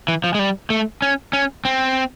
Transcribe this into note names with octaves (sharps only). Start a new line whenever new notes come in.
E3
F3
G#3
G3
A3
C#4
C#4
C4